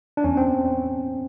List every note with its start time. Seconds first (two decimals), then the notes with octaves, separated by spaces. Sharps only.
0.17 D4
0.24 E2 C#4
0.37 C4